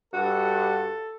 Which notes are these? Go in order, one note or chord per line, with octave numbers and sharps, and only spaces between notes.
G2 F#4 A4